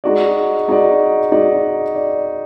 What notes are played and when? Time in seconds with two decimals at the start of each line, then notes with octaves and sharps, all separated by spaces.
0.04 G#3 D#4 F#4 D5
0.68 G#3 D#4 F#4 D5
1.31 G#3 D#4 F#4 D5
1.95 D5